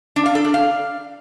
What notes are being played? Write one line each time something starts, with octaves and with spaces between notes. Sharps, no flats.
D4
F5
A4
D4
F5